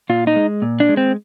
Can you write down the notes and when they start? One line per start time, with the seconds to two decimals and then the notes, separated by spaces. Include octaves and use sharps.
0.09 A#2 F4
0.27 D#4
0.36 G#3
0.62 A#2
0.80 D4
0.89 G#3
0.97 C4